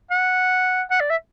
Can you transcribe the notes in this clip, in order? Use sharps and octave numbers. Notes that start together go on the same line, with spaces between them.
F#5
F#5
D5
E5